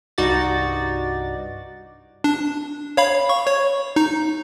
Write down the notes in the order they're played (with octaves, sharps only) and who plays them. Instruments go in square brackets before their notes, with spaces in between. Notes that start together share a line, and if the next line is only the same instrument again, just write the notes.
[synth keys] C2 G2 D#4 F#4 D5 A6
[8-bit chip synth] D4
C#5 F5 B5
C#6
C#5
D#4